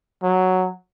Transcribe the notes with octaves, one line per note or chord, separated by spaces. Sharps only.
F#3